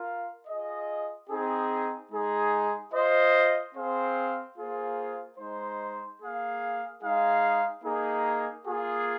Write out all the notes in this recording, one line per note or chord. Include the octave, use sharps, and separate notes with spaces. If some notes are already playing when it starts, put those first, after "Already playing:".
Already playing: F4 A#4 F5
F4 G#4 D#5
C4 D#4 G#4
G#3 D#4 G#4
F4 C5 D#5
C4 G#4 C5 F5
A#3 F4 G#4 C5
G#3 D#4 C5
A#3 G#4 F5
G#3 D#4 G#4 F5
A#3 D#4 G#4
A#3 F4 G#4